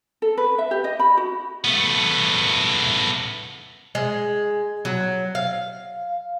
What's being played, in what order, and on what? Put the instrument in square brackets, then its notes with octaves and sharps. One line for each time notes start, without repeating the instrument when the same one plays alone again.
[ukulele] A4
B4
E5
G4
D#5
B5
F#4
[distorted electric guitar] A3 B3
[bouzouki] G#3
F#3
F5